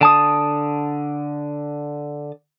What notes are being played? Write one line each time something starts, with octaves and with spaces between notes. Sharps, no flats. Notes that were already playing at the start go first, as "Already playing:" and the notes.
D3 A5 D#6